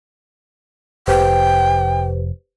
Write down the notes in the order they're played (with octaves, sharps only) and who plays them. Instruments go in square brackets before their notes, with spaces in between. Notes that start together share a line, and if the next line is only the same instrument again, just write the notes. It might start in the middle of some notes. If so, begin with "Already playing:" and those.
[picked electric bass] F1 [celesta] G4 B4 C5 [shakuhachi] G5